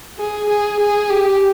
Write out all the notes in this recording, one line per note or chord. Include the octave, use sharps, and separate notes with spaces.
G#4
G#4
G#4
G4